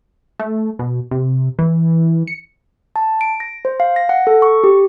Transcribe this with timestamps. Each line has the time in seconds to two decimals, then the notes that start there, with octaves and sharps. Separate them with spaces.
0.40 A3
0.79 B2
1.11 C3
1.59 E3
2.27 C#7
2.96 A5
3.21 D7
3.40 A#6
3.65 C5
3.80 F5
3.96 A#6
4.09 F#5
4.27 A4
4.42 C#6
4.64 G4